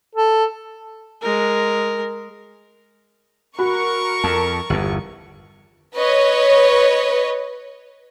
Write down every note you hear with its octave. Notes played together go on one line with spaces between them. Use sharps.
A4
G#3 A#4
F#4 A#4 B5 C#6
F2 A5
G1 E2
B4 C#5 D#5